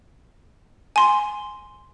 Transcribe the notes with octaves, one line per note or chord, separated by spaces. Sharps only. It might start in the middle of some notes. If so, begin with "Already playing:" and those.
G#5 C6